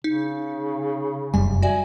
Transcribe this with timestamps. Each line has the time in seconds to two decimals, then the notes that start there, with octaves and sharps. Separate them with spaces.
0.04 C#3 D#4
1.34 F1 F#2 G3 G#5
1.62 F#4 D5 E5 G#5